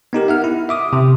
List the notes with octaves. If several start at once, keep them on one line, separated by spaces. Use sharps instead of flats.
B3 D#4 G4 A#4
E5 F#5 F6
E4
E5 D6 D#6
C3